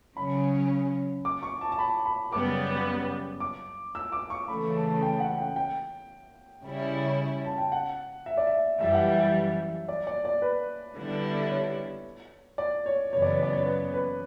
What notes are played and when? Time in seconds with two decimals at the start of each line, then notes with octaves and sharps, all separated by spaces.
0.17 C#3 F#3 C#4 B5
1.25 D6
1.43 C#6
1.61 A5
1.72 A5
1.79 B5
2.06 B5
2.32 F#2 C#3 G3 B3 D6
3.40 D6
3.95 E6
4.12 D6
4.30 C#6
4.48 C#3 E3 A3 B5
4.75 A5
5.02 G5
5.20 F#5
5.38 G5
5.56 G5
6.65 C#3 G3 C#4 E4
7.45 A5
7.58 G5
7.72 F#5
8.26 E5
8.37 D5
8.47 E5
8.80 F#2 E3 G3 E5
8.94 F#5
9.08 E5
9.88 D5
10.07 D5
10.25 D5
10.42 B4
10.96 D3 G3 B3 E4
11.50 C#5
12.58 D5
12.86 C#5
13.12 F#2 C#3 E3 B3 C#5
13.22 D5
13.33 C#5
13.43 D5
13.53 C#5
13.66 B4
13.94 B4